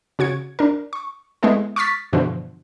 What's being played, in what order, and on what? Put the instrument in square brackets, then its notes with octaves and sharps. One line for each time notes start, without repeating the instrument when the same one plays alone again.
[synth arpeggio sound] C#3 F#4 G#6 C#7
D4 A#4
C#6
G#3 A3 B3 E4 A4
C#6 D6 F6 A6 B6
G2 B2 D3 E3 F3